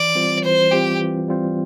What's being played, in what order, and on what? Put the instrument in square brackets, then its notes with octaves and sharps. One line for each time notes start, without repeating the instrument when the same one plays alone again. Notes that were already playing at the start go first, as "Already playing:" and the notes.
Already playing: [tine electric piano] E3 [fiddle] D5
[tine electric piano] G3 C4 F4 C5
[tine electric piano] E3 [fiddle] C5
[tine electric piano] G3 C4 F4 C5 [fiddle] G4
[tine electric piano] E3
G3 C4 F4 C5